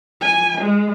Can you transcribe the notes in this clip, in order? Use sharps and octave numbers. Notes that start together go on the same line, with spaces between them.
G#5
G#3